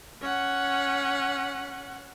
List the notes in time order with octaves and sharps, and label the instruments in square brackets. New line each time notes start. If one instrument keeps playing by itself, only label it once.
[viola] C#4 F#5